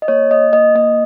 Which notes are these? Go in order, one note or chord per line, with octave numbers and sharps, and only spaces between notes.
D#5
A#3 C#5
A#3 D#5
A#3 D#5
A#3 D#5